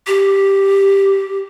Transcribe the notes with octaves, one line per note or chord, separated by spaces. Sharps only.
G4